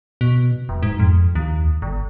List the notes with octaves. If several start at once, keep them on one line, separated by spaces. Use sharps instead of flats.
B2
E1
G#2
F2
D#2
G1